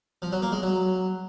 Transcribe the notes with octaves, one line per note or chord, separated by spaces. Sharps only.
F3
F#3
A#3
G#3
F#3